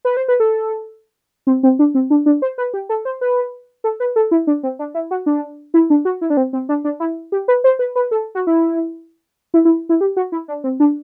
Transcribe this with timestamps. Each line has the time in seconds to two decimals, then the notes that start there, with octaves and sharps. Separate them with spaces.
0.05 B4
0.17 C5
0.28 B4
0.40 A4
1.47 C4
1.63 C4
1.79 D4
1.95 C4
2.10 D4
2.26 D4
2.42 C5
2.58 B4
2.74 G4
2.89 A4
3.05 C5
3.21 B4
3.84 A4
4.00 B4
4.16 A4
4.31 E4
4.47 D4
4.63 C4
4.79 D4
4.94 E4
5.11 F#4
5.26 D4
5.74 E4
5.90 D4
6.05 F#4
6.21 E4
6.30 D4
6.37 C4
6.53 C4
6.69 D4
6.84 D4
7.00 E4
7.32 G4
7.48 B4
7.64 C5
7.79 B4
7.96 B4
8.11 A4
8.35 F#4
8.47 E4
9.54 E4
9.65 E4
9.89 E4
10.01 G4
10.17 F#4
10.32 E4
10.48 D4
10.64 C4
10.80 D4